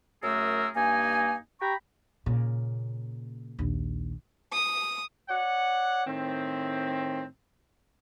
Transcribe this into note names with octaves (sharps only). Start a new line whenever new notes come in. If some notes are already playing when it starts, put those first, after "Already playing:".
F#2 A3 G#4 A#4 E6
G2 A#3 D#4 G#5
G4 G5 A#5 B5 C#6
A#2 C#3
A#1 D#2
D#6
C#5 D5 F#5
A2 D#3 C4